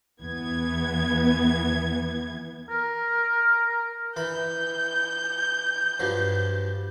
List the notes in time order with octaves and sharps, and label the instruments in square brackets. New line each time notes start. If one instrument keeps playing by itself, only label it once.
[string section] E2 E3 B3 G#6
[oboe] A#4
[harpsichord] E3 B5 [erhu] G6
[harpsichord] G2 F3 F#3